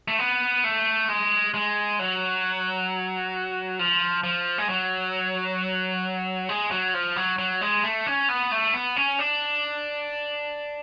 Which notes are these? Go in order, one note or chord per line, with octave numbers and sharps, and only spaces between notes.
A3
B3
A3
G#3
G#3
F#3
F3
F3
G#3
F#3
G#3
F#3
F3
F#3
F#3
G#3
A3
C#4
B3
A3
B3
C#4
D4